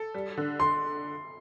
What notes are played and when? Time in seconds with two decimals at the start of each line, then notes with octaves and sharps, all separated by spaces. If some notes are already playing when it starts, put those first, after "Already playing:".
Already playing: A4
0.14 G3
0.37 D3
0.60 D3 C6